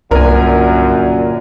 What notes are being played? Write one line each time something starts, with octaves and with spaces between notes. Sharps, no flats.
G1 C2 F#2 A#2 D4 A#4 G#5